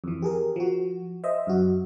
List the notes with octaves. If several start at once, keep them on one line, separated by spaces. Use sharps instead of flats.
F2 E3
G4 G#4 A#4
F3 F#4
C5 D#5 E5
F#2 F#4